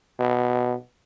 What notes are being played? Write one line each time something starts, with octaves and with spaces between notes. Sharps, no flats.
B2